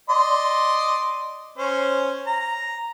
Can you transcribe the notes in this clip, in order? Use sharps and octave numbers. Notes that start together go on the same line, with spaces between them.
D5 D#5 C6
C#4 C5
A#5